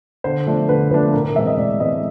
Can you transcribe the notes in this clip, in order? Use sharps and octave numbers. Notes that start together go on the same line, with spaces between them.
D3 C5
F3 A3 D4
D3 B4
F3 A3 D4 B4
A2 A#4
A#4
E3 G#3 C4 E5
D#5
A2 D5
E3 G#3 C4 D#5